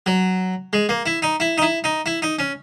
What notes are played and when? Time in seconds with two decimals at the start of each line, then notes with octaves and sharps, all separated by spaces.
0.06 F#3
0.73 G#3
0.89 A#3
1.06 E4
1.22 D#4
1.40 E4
1.58 D#4
1.62 E4
1.84 D#4
2.06 E4
2.22 D#4
2.39 C#4